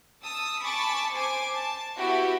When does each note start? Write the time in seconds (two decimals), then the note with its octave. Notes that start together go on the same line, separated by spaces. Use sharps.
0.22 A5 D#6 E6
0.60 G#5 A5 B5 C#6 D6
1.12 C5 G#5 D6
1.54 A5
1.97 B3 E4 F#4 G4